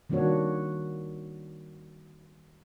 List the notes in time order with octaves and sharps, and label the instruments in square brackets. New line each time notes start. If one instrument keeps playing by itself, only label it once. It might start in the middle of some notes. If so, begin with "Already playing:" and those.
[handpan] D#3 G3 A#3 D4 F#4 C#5